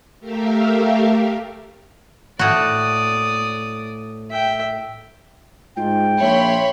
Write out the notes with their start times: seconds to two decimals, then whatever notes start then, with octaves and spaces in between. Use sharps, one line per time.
0.20 A3 G4 A#4 E5 F5
2.39 A2 F#4 D5 D#6
4.31 E5 G5
5.77 G#2 F4 G5
6.20 A#1 C#5 E5 B5 C6